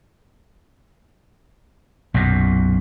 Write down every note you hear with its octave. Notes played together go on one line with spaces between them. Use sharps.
B1 F#2 A#2